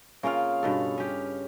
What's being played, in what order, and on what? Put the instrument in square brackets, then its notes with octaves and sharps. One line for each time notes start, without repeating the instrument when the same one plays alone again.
[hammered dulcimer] C#3 F5 [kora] A#3 C4 F4
[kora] G2 B2 A4
C#4 G4